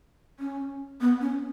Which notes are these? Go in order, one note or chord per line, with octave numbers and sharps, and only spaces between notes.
C#4
B3
C#4